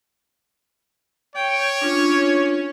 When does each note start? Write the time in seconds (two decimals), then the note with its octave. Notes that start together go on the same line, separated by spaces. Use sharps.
1.36 C#5 G5
1.82 C#4 D4 F4